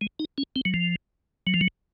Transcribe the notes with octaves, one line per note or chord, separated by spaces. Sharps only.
G#3
D#4
C#4
C4
F#3
F3
F#3
F3
F#3